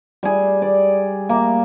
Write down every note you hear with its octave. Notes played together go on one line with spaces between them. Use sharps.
G3 G#4
D5
A#3